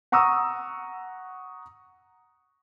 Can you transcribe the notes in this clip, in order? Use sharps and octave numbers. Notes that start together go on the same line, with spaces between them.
F#5 A#5 C#6 D#6 E6